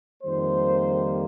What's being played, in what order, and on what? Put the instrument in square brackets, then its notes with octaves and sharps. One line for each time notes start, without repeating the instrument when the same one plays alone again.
[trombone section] F2 D#3 G3 A#3 C5